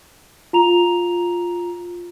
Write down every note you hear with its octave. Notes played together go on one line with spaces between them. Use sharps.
F4 A#5 F7